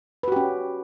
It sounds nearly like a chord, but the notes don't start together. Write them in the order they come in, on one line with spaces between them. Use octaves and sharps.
B4 F#4 G4 C#4